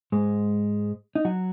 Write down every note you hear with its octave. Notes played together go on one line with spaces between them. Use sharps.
G#2 G#3
D#4
F#3 F#4